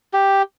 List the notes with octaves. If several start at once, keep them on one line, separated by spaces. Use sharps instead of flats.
G4